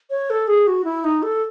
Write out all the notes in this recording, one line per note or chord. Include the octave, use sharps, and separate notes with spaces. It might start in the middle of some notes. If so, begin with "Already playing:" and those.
C#5
A4
G#4
F#4
E4
D#4
A4